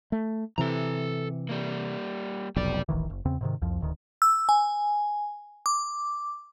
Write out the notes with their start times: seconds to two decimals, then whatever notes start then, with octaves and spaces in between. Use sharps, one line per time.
0.12 A3
0.58 C3 E3 A4 A#5
1.49 G3 A#3
2.56 F1 B1 G4 D5
2.89 D#1 A1 D#3 E3
3.10 F#1
3.25 E2 C#3 C4
3.41 G#2 C3 D#3
3.62 C2 F2 F3
3.81 D1 D2 D#3
4.22 E6
4.49 G#5
5.66 D6